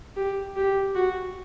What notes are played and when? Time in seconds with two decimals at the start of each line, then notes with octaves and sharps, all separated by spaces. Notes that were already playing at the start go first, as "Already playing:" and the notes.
0.16 G4
0.56 G4
0.95 F#4